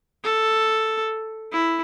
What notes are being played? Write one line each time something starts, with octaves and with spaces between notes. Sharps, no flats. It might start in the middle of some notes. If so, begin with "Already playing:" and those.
A4
E4